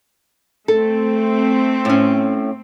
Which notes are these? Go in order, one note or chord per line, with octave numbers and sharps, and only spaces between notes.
A3 C4 A4
A2 C#4